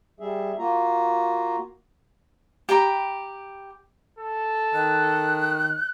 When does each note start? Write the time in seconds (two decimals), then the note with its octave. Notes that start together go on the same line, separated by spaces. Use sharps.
0.20 G3 G#4 E5
0.58 A#3 F4 F#4 A#5
2.69 G4 G5 A#5 B5
4.19 A4
4.74 D#3 F#6